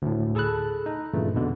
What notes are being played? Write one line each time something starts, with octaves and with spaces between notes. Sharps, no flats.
D2 A2
G#4 A4 A5 B5 F#6
D#4
G2 A#2 C#3 E3 A3
E2 B2 D3